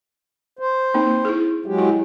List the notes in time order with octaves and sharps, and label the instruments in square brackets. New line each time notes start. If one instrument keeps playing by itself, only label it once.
[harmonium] C5
[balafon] A#3 C4 D#4
E4 G#4
[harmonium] F#3 G#3 G4
[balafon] E4